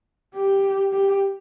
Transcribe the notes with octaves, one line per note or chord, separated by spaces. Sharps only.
G4
G4